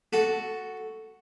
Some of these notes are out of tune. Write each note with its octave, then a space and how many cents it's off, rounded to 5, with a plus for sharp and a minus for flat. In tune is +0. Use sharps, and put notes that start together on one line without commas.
F#4 +0 A4 +0